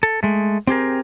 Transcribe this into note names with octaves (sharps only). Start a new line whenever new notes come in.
A4
G#3 A3
C4 G4 G#4 A#4